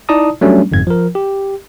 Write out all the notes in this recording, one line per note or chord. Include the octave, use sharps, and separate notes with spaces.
D#4 E4 D5 A5 A#5 D#6
F#3 G3 A3 C#4 D4
G1 F2 G#2 G#6
F3 A#4
G4